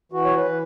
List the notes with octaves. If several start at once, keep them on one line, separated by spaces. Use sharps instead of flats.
E3 F#4
C#5
B4
E3